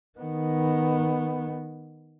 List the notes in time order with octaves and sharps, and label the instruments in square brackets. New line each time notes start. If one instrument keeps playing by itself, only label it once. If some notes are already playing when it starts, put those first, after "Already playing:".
[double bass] D#3 B3